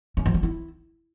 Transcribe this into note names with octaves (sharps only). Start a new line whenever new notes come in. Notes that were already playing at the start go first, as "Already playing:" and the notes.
C#4
F3
D4
E4